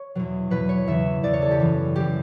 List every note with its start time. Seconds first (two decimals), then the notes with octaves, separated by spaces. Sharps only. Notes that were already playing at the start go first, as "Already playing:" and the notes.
Already playing: C#5
0.15 E2 B2 F#3
0.50 E2 B2 F#3 B4
0.69 C#5
0.87 E2 C#3 E3 E5
1.23 E2 C#3 E3 D5
1.33 C#5
1.42 A4
1.51 G4
1.60 F#2 E3
1.96 F#2 E3 G4